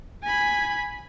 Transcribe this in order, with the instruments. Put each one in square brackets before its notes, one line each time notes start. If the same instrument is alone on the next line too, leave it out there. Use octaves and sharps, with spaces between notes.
[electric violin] G#5 B5